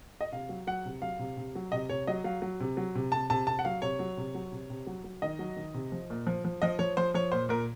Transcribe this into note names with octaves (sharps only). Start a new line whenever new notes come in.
D#5
C3 F5
F#3
F#3 F#5
C3
F#3 F5
C3
C3
F#3
C3 D#5
C3 C#5
F#3 D#5
F#3 F5
F#3
C3
F#3
C3
C3 A5
C3 A5
C3 A5
F#5
F#3 F5
C3 C#5
F#3
C3
F#3
C3
C3
F#3
F#3
D#3 D#5
F#3
D#3
C3
F3
A#2
F3
F3
F3 D#5
F3 C#5
F3 C5
F3 C#5
A#2 C5
A#2 A#4